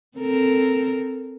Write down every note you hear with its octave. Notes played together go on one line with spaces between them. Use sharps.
C4 A4 A#4